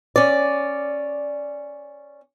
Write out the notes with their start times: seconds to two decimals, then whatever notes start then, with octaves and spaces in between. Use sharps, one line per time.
0.16 C#4 D5